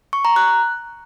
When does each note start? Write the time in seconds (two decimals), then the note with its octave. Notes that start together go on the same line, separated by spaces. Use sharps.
0.13 C#6
0.25 A#5
0.36 F#6